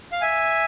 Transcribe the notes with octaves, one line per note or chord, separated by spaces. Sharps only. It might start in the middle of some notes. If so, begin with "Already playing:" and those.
F5
E5 G#5